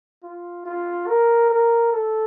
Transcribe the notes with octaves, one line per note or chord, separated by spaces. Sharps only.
F4
F4
A#4
A#4
A4